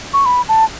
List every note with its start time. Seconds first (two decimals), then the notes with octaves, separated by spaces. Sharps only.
0.13 C#6
0.26 B5
0.49 A5